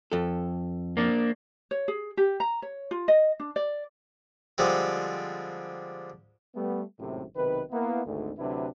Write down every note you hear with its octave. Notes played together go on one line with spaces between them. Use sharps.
F2 A4
A#3 D4
C#5
G#4
G4
A#5
C#5
F4
D#5
D4
D5
D3 F3 G3 G#3 C4
G3 A3 B3
G#1 F#2 A2 C3
B1 C3 D#3 B4
A#3 B3 E4
G#1 D2
D2 C3 F#3 D4 E4 B4